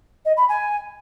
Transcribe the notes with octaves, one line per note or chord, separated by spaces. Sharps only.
D#5
B5
G#5